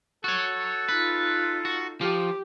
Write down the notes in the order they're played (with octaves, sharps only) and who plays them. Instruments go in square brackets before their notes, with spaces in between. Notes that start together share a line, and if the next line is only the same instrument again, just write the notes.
[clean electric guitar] F#4 C#5 [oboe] A4
[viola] D#4 F4 [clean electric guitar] B4
[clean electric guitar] F#4
[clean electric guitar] F3 F4 [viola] G4